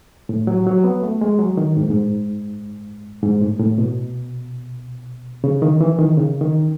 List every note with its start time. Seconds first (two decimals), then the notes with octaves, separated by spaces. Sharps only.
0.29 A2
0.47 F#3
0.67 F#3
0.84 B3
1.03 A3
1.21 G#3
1.39 F#3
1.57 D#3
1.77 G#2
1.83 A2
1.90 G#2
3.23 G#2
3.42 A2
3.60 A2
3.78 B2
5.44 C#3
5.62 D#3
5.81 E3
5.99 D#3
6.17 C#3
6.41 D#3